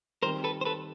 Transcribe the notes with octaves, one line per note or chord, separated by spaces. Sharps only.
D#3 G3 C4 A#4 C5
A4 B4
C5
A4 B4